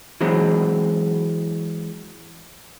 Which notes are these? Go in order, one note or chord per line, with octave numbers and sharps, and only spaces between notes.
E3 F#3 G#3 C4